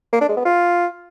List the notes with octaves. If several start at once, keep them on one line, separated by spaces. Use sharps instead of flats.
A#3
D4
G#3
B3
F4